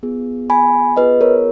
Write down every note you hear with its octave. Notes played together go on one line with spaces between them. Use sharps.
B3 F4 G#4
G#5 B5
B3 F4 G#4 B4 D#5
A#4 C#5